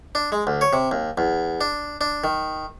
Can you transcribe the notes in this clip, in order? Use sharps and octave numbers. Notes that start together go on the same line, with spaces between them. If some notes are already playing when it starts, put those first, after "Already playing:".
D4
G#3
D2
C#5
C3
D#2
E2
D4
D4
D#3